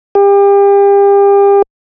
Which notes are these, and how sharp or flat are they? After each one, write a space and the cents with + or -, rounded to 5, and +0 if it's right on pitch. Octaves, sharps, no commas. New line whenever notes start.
G4 +35